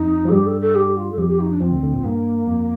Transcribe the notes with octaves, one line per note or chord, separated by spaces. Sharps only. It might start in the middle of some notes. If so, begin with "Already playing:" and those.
Already playing: F2 D#4
F3
A4
G2 G3 G4
A4
A4
G4
F4
A4
F2 F3 G4
G4
D#4
D4
F2 F3 C4
D2 D3
D2 D3
A#1 A#2
G2 A#3
F2